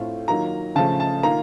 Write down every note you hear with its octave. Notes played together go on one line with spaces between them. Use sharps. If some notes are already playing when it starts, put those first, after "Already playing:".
Already playing: A2 A3 C4 F4
D#3 F#3 A#3 F4 A#5
C#3 F3 A3 A5
A5
D#3 A#3 F4 A#5